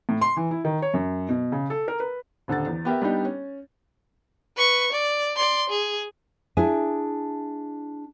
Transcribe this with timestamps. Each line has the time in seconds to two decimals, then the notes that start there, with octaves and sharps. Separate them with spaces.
0.09 A2
0.21 C6
0.37 E3
0.51 E4
0.65 D#3
0.82 C#5
0.94 F#2
1.29 B2
1.52 C#3
1.70 A4
1.88 A#4
2.00 B4
2.48 D#1 D3 A4 F#5 A6
2.66 E2
2.85 B3 G4 A#4 E5
3.02 G3 B3 D4 D#4 G4
3.25 C#4
4.57 B4 C#6
4.92 D5
5.36 D5 C6
5.69 G#4
6.57 D4 E4 G#4 G#5